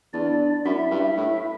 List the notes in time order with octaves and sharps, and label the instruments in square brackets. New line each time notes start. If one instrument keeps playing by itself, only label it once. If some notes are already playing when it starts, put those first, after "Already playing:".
[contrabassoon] E2 [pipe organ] D4 D5
[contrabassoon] F#2 [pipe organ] E4 E5
[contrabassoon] G2
A2